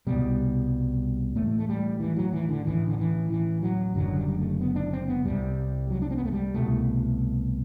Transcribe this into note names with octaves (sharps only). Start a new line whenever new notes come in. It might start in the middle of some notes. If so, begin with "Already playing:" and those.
C2 B2 G3
A1 A2 A3
A3
G3
E3
F#3
E3
D3
A1 A2 E3
D3
E3
E3
F#3
F#1 F#2 D3 F#3
G3
G3
A3
B3
D4
C4
B3
C2 C3 G3
F#3
D4
C4
B3
A3
G3
C2 B2 A3